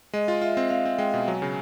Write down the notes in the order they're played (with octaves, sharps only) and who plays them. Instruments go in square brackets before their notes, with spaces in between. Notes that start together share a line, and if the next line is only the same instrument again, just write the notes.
[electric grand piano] G#3 [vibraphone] D#5
[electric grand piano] F4
[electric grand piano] F4 [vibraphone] E5
[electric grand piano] C4
[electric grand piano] C4 [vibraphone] F5
[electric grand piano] C4
[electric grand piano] G#3 [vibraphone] G5
[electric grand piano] B2
[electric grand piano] F#3 [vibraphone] G#5
[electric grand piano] C#3